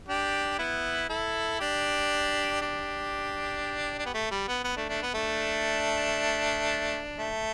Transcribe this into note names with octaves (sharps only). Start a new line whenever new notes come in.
D4 G4
B3 E4
E4 A4
D4 G4
D4 G4
D4
B3
A3
G3
B3
B3
A3 D4
A3 D4
B3
A3 D4
A3